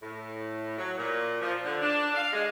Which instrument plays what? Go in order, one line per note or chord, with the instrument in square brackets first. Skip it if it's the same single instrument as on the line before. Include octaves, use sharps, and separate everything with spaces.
[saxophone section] A2
F#3
A#2
F3
D3
D4
F5
G#3